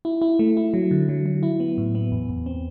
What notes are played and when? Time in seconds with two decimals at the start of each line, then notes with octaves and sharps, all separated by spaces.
0.05 E4
0.22 E4
0.39 A3
0.57 E4
0.74 F#3
0.91 D3
1.09 F#3
1.26 F#3
1.43 E4
1.60 B3
1.78 A2
1.95 B3
2.12 E2
2.29 E2
2.46 C4